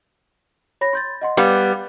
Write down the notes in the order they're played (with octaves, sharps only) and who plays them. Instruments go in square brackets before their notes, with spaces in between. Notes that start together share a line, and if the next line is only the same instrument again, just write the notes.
[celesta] C#5 B5 A#6
C6 G6 A6
D#5 F#5 C6
[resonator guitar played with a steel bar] G3 B3 [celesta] F5